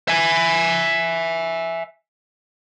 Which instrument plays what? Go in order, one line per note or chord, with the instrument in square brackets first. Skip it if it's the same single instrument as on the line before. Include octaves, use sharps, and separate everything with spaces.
[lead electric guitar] E5 G#5